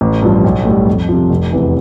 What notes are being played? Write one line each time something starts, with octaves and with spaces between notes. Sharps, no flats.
A1
G2 F3
B1
A2 G3
F2
C3 F3
F1
E2 C3 E3